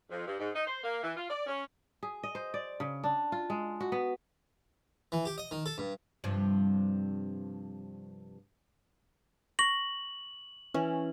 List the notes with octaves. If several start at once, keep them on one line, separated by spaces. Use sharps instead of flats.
F2
G2
G#2
D#4
C5
A#3
E3
F4
D5
C#4
G#4
D#5
C5
D5
C#3
D4
F4
G#3
F#4
B3
E3
G4
D#5
D#3
A4
G2
G2 C3 F3
C#6 A#6 F#7
E3 C#4